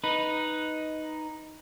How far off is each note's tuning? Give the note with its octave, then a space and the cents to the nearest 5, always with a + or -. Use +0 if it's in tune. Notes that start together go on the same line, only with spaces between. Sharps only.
D#4 +0 B4 +0